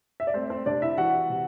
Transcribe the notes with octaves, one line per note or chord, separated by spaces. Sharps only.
E5
D5
A3 C4 C5
C4 C5
C3 D4 D5
E4 E5
E3 F#4 F#5
C3